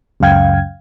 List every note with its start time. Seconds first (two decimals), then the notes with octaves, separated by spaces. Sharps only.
0.20 C#2 F#2 C#3 F5 G5 G#6